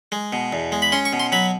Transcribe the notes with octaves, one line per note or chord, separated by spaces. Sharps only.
G#3
B2
E2
G#3
B5
C#4 C6
C#6
B2
C6
F#3 B5